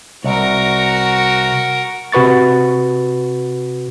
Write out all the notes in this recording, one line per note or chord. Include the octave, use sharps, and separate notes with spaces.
C2 F#4 A#4
C3 F#4 B4 C#6 A6